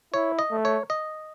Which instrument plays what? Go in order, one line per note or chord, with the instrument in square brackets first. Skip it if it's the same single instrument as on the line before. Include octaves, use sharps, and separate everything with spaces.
[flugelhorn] E4 [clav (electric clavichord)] C#5
[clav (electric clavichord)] D#5
[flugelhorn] A3
[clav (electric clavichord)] C#5
D#5